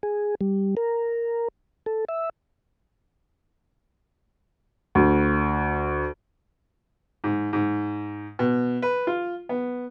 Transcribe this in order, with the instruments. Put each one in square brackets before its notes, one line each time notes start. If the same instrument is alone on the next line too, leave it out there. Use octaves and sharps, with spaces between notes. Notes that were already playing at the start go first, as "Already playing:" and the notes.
[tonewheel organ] G#4
G3
A#4
A4
E5
[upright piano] D2
[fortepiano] G#2
G#2
B2
B4
F4
B3